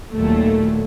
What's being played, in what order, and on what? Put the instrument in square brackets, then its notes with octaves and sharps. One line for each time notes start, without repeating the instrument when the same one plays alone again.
[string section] D#2 A#2 F#3 A3